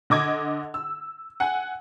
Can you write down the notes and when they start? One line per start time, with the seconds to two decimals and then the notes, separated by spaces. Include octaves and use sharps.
0.10 D3 D#5 D6 G#6
0.74 E6
1.40 F#5 G#5